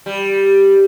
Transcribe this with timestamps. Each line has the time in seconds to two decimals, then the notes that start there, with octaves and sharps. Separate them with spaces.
0.06 G3